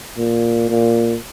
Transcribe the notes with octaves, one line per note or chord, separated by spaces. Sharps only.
A#2
A#2